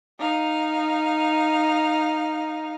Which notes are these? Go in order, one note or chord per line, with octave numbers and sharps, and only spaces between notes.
D#4 F5